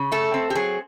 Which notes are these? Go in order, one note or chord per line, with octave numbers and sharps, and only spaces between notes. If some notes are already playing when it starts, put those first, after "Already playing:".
Already playing: C#3
A3 A4
C4
G4
F#3 G#4